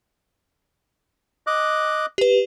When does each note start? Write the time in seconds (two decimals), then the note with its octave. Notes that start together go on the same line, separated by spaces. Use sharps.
1.47 D#5 D6 F#6
2.18 G4 B4